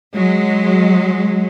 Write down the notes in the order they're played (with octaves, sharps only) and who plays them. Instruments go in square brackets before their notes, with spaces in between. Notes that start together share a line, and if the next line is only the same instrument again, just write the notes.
[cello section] F#3 G#3